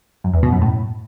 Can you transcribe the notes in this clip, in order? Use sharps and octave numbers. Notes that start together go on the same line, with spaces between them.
F#2
E2
B2
F#2
A2